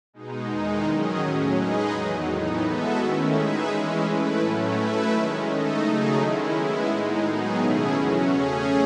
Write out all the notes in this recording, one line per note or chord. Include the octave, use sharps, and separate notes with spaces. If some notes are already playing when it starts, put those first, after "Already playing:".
B2 G#3 D#4
E2 D#3 G#3 D#4
D#3 F#3 C#4 G#4 D#5
A2 F#3 C#4
G#3 D#4 G#4 B4 D#5
E2 D#3 F#3
A2 E3 B3 D#4
G#3 B3 F#4 A4 E5
D#3 A3 C#4 E4
G#3 D#4 G#4 B4 E5
E3 G#3 C#4
A3 E4 B4
A2 F#3 A3 C#4
A3 E4 B4 E5
D#3 G#3 C#4
A3 D#4 A4 D#5
C#3 F#3 A3 D#4 G#4
D#3 G#3 C#4 E4
G#3 B3 E4
A2 G#3 D#4
D#3 F#3 B3 D#4 G#4
B2 A3 C#4 E4 G#4
E2 C#3 F#3 C#4 F#4
A3 C#4 G#4